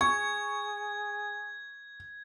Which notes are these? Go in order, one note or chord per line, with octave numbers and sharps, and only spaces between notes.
G#4 C#6 G#6